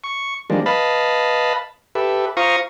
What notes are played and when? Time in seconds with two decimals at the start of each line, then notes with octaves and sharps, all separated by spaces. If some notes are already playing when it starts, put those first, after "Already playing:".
0.04 C#6
0.50 D#3 F3 G3 G#3 A#3 D4
0.66 B4 D#5 F5 A5 B5
1.95 G4 A4 B4 E5
2.37 F4 C5 F5 A#5 C#6 D#6